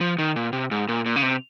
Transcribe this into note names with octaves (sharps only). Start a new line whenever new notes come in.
F3
D#3
A#2
C3
G#2
A#2
A#2
C#3
C3